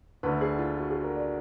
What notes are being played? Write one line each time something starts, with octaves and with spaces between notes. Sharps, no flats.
D2 D3 B4
G#4
F4
F#4
G#4
A#4
D5